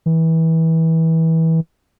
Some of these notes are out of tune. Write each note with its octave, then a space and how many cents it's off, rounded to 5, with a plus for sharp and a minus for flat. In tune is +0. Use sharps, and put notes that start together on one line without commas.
E3 -25